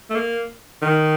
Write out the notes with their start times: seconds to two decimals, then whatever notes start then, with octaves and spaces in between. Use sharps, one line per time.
0.10 A3
0.15 A#3
0.82 D#3